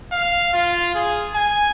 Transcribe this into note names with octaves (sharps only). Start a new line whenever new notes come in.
F5
F4
G#4
G#5